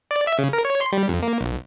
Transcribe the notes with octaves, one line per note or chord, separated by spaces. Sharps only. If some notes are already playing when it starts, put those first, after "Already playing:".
D5
E5
C#3
A#4
C#5
C6
G3
F2
A#3
B1